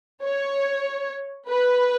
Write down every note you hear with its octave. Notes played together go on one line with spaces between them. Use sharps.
C#5
B4